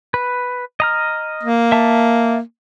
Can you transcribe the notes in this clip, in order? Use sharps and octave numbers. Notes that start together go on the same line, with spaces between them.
B4
D#5 A#5 F6
A#3
E5 A5